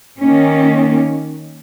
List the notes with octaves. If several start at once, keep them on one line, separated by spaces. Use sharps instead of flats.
D#3 A#3 C#4